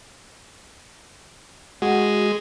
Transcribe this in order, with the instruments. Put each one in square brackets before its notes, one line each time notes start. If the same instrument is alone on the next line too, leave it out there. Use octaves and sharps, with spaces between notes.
[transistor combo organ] G#3 [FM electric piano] F#4